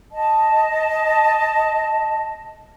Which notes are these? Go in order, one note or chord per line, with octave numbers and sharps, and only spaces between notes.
D#5 A5